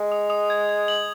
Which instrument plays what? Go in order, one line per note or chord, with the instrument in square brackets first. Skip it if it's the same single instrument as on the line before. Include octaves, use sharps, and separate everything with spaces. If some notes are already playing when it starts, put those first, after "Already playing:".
Already playing: [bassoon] G#3
[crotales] D#6
D#6
G#6
G#6
F#7